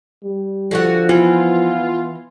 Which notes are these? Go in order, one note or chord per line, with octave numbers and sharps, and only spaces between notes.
G3
D3 F3 F#4 F#5
E3 B3 F4